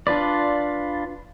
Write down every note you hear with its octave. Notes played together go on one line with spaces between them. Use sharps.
D4 F4 B4 D5